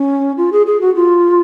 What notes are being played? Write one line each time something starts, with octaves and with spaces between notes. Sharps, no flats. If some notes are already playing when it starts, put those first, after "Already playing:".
Already playing: C#4
F4
G#4
G#4
F#4
F4